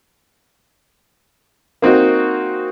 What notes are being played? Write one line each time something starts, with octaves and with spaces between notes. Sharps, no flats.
A#3 C4 D#4 F#4